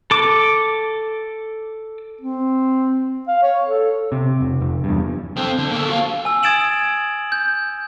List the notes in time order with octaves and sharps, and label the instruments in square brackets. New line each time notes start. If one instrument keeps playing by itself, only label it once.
[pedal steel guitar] A4 D6
[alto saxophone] C4
F5
C#5
A4
[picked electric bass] C3
F1
F1
E2 G2
[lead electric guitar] C4 A4
D3
A#3 A4
F#4 F5
[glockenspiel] G#5 E6
D#6 G#6 A6 D7 E7 F#7
G6